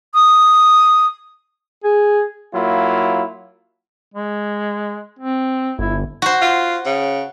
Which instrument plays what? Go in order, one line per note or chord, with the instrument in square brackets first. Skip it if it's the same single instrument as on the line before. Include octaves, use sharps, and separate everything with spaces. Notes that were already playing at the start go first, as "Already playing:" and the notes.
[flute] D#6
[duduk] G#4
[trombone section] F#3 A#3 E4 F4
[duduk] G#3
C4
[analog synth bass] G1 [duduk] E4
[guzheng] F#4 C5
[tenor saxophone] F4
C#3